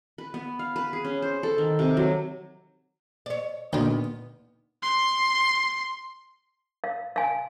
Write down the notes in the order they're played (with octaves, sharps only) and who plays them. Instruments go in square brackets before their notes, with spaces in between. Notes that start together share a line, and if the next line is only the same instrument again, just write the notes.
[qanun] B4
B3
F5
B4
G#4
C#4
C5
A4
D#3
C3
F#3
[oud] C#5 D5
[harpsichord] D2 D4 [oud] A#2 D#3 B3
[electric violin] C6
[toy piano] F5
F5 G#5